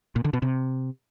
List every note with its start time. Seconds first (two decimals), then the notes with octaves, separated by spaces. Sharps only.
0.16 A#2
0.25 D3
0.33 B2
0.42 C3